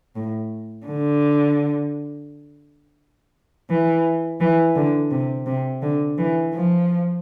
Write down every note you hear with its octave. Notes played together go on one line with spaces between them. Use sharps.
A2
D3
E3
E3
D3
C3
C3
D3
E3
F3